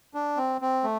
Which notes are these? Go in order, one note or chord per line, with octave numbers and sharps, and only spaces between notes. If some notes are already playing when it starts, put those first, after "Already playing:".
D4
C4
C4
A3